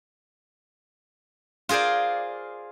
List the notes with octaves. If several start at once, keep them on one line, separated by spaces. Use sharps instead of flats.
F4 G#4 A#4 C5 D5